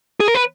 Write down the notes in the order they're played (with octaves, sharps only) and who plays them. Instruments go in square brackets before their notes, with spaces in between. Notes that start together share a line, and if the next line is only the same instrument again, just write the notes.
[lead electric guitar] G#4
A#4
B4